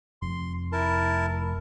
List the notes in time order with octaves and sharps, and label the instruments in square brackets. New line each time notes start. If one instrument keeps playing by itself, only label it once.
[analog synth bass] F1 [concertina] C6
[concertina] E4 A#4 A5